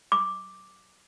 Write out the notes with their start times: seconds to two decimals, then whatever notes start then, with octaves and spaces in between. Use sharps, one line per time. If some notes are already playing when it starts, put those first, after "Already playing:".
0.12 D6